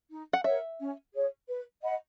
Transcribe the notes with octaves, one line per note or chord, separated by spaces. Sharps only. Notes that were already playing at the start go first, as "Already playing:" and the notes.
D#4
F#5
A#4 C#5 E5 F#5
C#4
G#4 C#5
B4
D#5 F#5 B5